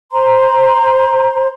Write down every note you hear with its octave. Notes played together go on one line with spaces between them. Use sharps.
C5 A#5 C6